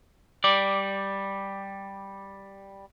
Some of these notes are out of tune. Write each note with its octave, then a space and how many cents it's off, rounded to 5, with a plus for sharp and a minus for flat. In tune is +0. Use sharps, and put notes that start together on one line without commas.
G3 +0 D5 +0